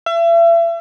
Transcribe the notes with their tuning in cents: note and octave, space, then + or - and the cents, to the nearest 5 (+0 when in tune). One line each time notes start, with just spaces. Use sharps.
E5 +35